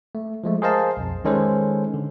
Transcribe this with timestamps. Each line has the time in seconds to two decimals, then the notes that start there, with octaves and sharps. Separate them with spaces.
0.15 A3
0.44 F3 G#3 A3
0.62 G#4 A#4 C5 D#5 F5 A5
0.97 B1 F2
1.25 D#3 G#3 C#4 A4 B4 C5
1.94 D3